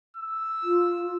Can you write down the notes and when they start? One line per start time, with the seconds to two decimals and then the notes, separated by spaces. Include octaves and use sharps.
0.17 E6
0.63 F4